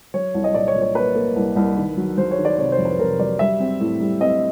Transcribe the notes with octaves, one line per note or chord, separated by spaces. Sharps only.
F#3 C#5
C2
D#5
A#2 D5
C#5
A#2
C#5
A#3 B4
A#3
C2
C2
D#3
F#3
F#3 C5
C#5
D#3
D5
C3 C#5
C5
F2
B4
C3 A#4
F#3 D5
G3 E5
C4
A2
G3
C4 D#5